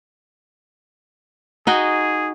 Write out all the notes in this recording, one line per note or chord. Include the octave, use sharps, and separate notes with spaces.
D#4 F#4 G#4 G5